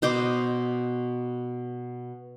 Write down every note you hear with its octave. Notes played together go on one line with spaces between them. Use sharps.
B2 C5 D#5 D6